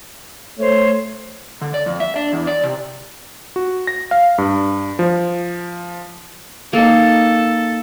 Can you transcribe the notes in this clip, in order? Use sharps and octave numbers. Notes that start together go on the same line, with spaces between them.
A3 C5 C#5
D3
D5
F2
E5
D4
E2
D5
C3
F#4
A#6
F5
G2
F3
A#3 D#4 A4